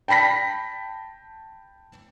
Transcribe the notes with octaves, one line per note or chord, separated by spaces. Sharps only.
G5 A5 B5 A#6 B6